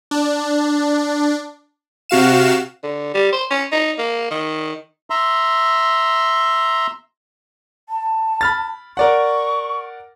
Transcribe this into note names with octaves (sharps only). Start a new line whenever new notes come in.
D4
C3 F#4 F5 E7
D3
G3
C5
C#4
D#4
A#3
D#3
E5 A#5 C6
A5
B5 F6 A6
A#4 D5 F#5 C#6